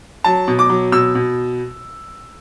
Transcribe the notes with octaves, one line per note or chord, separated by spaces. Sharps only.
F#3 A5
B2
D6
F#3
B2 E6
B2